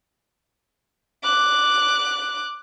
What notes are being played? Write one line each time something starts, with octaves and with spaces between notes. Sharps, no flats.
D6 F#6